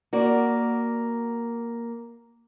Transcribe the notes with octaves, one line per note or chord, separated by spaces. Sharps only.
A#3 F#4 D5